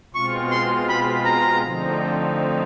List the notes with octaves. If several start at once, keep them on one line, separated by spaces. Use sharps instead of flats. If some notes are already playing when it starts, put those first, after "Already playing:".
B2 G#3 C4 F4 C#6
C6
B5
A#5
D3 F3 A3 C4 D#4